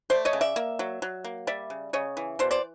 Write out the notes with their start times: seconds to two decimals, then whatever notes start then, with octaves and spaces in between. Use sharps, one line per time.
0.10 A3 C5 D5
0.25 C#5 D#5
0.33 C#3
0.41 D5 E5
0.56 A#3
0.79 F#3
1.02 F#3
1.24 A#3
1.47 G3 D5 E5
1.70 C#3
1.93 C#3 C#5 D#5
2.17 E3
2.39 B2 C5 D5
2.51 C5 D5